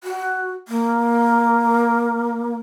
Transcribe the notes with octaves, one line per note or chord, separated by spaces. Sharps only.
F#4
A#3